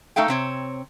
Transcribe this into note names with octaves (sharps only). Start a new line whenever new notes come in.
A3 D#4 A4 F5 G5
C3 C4 C#5